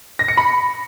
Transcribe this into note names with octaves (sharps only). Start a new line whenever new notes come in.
A#6
C#7
B5